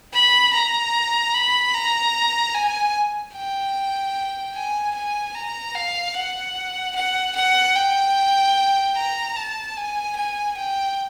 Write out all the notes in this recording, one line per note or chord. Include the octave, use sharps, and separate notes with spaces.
B5
A#5
B5
A#5
G#5
G5
G#5
G#5
A#5
F5
F#5
F#5
F#5
G5
A#5
A5
G#5
G#5
G5